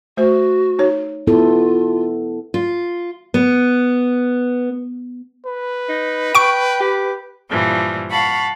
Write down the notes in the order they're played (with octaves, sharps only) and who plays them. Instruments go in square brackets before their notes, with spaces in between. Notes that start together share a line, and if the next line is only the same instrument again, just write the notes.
[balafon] A3 C5 [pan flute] F#4
[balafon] D#4 C#5
[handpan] B3 E4 A4 [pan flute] F4
[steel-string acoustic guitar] F4
B3
[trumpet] B4
[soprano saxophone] D#4
[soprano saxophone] G5 [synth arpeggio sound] C#6 D7
[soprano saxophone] G4
[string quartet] G2 A#2 E3 F3 G3
F5 F#5 A5 B5 C#6